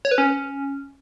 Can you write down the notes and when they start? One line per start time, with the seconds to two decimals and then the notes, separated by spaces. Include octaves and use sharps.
0.05 C#5
0.11 B4
0.18 C#4